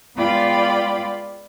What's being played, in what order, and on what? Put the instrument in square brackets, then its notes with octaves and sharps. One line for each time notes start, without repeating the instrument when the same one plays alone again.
[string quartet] G#3 B3 F4 D5 G5 B5